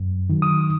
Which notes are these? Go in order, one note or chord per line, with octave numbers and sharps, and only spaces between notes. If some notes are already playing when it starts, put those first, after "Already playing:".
Already playing: F#2
D#3 F#3
D#6